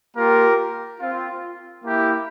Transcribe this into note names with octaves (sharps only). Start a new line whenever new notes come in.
A#3 F4 G4 A#4
C4 F4
A#3 E4 G4